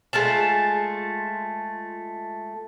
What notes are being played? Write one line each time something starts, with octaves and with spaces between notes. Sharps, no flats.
G#3 A3 F4 A5